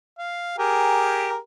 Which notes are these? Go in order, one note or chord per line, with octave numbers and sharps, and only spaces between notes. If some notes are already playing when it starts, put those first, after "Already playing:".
F5
G4 G#4 A#4